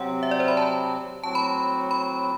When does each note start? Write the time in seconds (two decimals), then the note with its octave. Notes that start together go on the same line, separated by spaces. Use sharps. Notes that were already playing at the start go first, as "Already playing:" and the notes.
Already playing: C3 F#3 C4 F#5
0.23 E5
0.31 D5
0.40 C5
0.48 B5
0.57 A5
1.24 A2 F#3 C4 F#4 A5
1.35 B5
1.91 B5